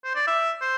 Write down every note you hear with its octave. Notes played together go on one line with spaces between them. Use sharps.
C5
D5
E5
C5